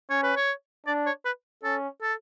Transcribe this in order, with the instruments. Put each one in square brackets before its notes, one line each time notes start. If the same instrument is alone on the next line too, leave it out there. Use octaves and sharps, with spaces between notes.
[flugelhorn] C#4 [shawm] C#5
[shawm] B4
C#5
[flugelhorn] D4 [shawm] D5
[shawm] C#5
B4
[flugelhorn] C#4 [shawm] A4
[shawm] A4